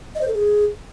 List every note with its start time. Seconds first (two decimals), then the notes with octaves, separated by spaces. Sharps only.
0.15 D#5
0.21 C5
0.28 A4
0.34 G#4